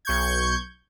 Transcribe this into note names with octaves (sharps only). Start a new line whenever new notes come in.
B1 C#6 G6 G#6